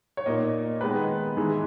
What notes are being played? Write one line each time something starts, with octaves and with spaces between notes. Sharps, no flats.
C#5
A#2 A#3 D#4 D#5
D#3 G#3 B3 D#4 B4
G#2 E3 G#3